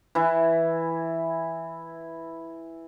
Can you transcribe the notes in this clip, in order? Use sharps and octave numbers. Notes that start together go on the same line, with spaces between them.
E3 E4